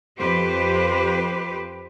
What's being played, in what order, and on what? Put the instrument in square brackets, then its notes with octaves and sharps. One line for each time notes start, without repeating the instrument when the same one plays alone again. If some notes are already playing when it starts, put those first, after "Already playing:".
[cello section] F2 G4 B4 C5